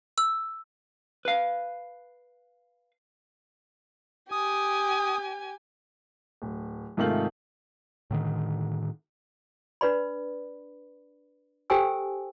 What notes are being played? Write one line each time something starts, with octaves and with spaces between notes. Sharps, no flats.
E6
B4 F5
G4 G#5 D#6
D1
G#2 C3 D#3 A3 F4 F#7
A2 D3 D#3
D4 B4 D5 B5
G4 A4 C5 G5 G#5 E6